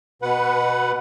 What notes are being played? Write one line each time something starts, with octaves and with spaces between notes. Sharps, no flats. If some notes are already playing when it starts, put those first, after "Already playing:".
B2 B4 F#5